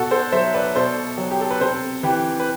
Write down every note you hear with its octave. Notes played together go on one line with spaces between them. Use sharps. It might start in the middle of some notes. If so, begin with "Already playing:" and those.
Already playing: B2 F#4 A4
A4 C5
F#3 C5 E5
B4 D5
B2 A4 C5
F#3
G4
A4
B4
C3 A4 C5
E3 G4 B4
B4